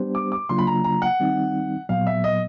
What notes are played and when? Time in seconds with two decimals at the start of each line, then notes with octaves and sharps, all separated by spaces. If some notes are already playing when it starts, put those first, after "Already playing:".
Already playing: G3 B3 D4 G4 C5
0.15 D6
0.32 D6
0.49 C#3 F#3 A#3 D4 F4 C6
0.58 B5
0.67 A#5
0.84 A#5
1.02 F#5
1.20 D#3 G3 C4 D#4
1.89 A#2 F#3 B3 F5
2.07 E5
2.24 D#5